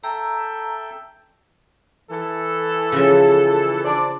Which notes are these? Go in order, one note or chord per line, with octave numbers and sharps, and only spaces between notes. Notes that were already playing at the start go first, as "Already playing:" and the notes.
A4 E5 G5 A#5
E3 A4
C#3 F3
D4 C5 D5